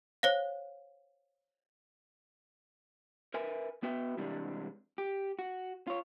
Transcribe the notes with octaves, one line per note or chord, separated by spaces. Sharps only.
C5 C#5 F5
A#4 B4 E5 G#5
B3 F#4 B4 E5 G5
C3 E3 G3 G#3 D4
G4
F#4
F4 C#5